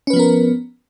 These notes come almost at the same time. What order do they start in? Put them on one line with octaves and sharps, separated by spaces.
C#4 B4 F3 B3 A#4